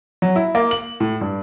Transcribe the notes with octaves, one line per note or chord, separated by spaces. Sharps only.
F#3
E4
A#3
F#7
A2
G2